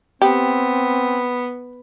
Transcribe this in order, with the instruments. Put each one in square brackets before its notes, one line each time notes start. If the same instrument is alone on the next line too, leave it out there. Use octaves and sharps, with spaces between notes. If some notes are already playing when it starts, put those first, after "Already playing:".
[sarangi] B3 [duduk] C4 [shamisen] G4